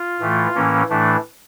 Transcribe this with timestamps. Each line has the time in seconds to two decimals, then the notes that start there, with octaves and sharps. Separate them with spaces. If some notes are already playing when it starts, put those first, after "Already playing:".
Already playing: F4
0.20 A2 E3 A3
0.55 A2 E3 A#3 C#4
0.89 A2 E3 A3 D4